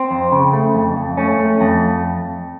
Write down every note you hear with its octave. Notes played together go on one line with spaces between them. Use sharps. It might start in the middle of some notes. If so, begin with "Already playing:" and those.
Already playing: C4
F2
C#3
A3
F2
F2
A3 C#4
A3
F2